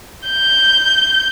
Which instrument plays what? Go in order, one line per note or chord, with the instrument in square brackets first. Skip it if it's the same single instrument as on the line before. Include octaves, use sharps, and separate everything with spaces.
[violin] G6